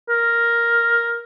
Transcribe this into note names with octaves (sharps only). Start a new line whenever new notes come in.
A#4